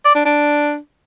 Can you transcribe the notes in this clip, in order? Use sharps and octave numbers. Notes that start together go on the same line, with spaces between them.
D5
D4
D4